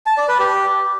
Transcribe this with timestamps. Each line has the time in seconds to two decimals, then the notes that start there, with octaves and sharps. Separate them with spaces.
0.06 A5
0.17 D5
0.28 B4
0.39 G4